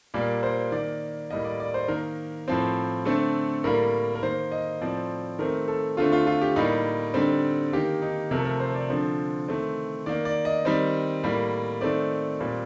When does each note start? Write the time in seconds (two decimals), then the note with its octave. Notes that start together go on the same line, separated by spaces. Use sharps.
0.14 A#2 G3 A#3 D5
0.43 C5
0.72 D#3 A#3 D5
1.30 A2 G3 A#3 D#5
1.45 D5
1.60 D5
1.74 C5
1.88 D#3 A#3 A#4
2.48 A2 F3 C4
3.05 D3 A3 C4 A4
3.64 A2 G3 A#3 A#4
4.15 A#4
4.23 D#3 A#3 C5
4.52 D#5
4.81 A2 F3 C4 D5
5.39 D#3 A3 C4 A#4
5.68 A4
5.97 D3 A3 C4 F4
6.12 F4
6.27 F4
6.41 G4
6.56 A2 G3 A#3 D#4
7.14 D3 G3 C4
7.73 D#3 A#3 G4
8.02 D#4
8.31 C3 F3 A3 A#4
8.39 A4
8.45 A#4
8.60 C5
8.75 D5
8.90 D3 F3 C4
9.48 D#3 A3 C4
10.06 D#3 A#3 D5
10.25 D5
10.45 D#5
10.65 D#3 G3 C4
11.23 A2 G3 A#3
11.81 D#3 A3 C4 D5
12.40 A#2 G3 C4